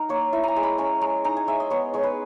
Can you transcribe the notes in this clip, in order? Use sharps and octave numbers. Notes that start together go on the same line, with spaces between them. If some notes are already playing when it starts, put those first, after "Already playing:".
Already playing: D#4 A#4
A#3 C#5
E4 E5
G#5 A#5
G#3
B5
C#4 A#5
G#3 A#5
D#4 A#5
G#5
G#3 E5
D#5
B3 C#5
G#3 C#5
B4